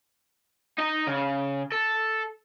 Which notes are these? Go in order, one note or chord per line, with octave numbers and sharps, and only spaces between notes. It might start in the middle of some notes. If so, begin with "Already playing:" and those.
D#4 D#5
C#3
A4